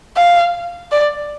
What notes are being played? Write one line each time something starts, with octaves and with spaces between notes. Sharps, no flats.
F5
D5